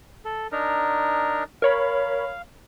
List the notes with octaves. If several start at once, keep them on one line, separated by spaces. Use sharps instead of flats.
A4
D4 D#4 A#4
A#4 C#5 F5 B5